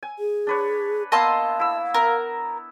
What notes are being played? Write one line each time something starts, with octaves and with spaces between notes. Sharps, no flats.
G#5
G#4
D4 B4 C#5
A#3 B3 D#5 F5 A5 C6 E6
E4 E6
B3 A#4